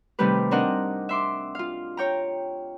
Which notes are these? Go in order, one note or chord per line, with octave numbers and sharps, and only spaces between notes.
C3 D#3 G3 A3 G4 B4
C4 D4 D#4 A#4 D#5 F#5
E5 C6 D6
F4 F5
C#5 G5 A#5